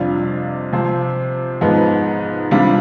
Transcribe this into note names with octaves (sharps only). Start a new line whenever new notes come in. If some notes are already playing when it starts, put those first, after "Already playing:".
Already playing: F2 C3 G3 D4 F4
C3 F3 C4
G#2 F3 B3 D#4
C3 G3 D4 F4